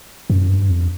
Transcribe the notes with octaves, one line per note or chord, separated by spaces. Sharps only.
F#2
G2
F2